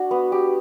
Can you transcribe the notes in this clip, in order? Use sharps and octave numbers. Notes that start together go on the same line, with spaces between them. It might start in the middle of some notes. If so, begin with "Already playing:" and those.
Already playing: D4 F#4
B3
G4